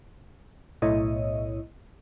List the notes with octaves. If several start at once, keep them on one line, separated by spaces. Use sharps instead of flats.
B1 A2 E4 C#5 D#5